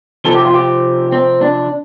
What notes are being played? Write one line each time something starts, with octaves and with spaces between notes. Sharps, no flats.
C3 F3 C4 A4
G4
F4
G4
C4
D4